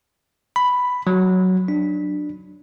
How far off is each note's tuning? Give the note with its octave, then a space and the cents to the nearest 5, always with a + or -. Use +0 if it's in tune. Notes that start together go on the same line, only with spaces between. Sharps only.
B5 +5
F#3 +5
D4 +15